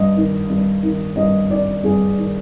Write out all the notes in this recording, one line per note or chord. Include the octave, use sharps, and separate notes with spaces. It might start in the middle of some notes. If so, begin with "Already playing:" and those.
Already playing: G2 D#5
D#3
G2
D#3
G2 D#5
D#3 D5
G2 G#4
D#3